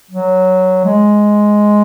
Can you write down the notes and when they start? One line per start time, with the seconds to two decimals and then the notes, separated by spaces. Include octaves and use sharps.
0.11 F#3
0.85 G#3